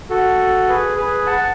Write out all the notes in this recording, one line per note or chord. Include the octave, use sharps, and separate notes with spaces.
F#4 A4
G#4 B4
G#4 B4
F#5 A5
F#5